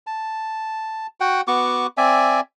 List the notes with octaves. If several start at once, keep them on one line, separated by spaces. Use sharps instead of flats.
A5
F#4 F#5 G5
B3 F#4 C#6 D6
C4 D5 E5 G#5